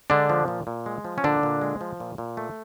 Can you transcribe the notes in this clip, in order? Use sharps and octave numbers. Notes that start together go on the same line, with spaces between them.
D3 G#3 D4
F3
A#2
A#2
G#3
F3
C#4
A#2 D3 D4
A#2
G#3
F3
A#2
A#2
A3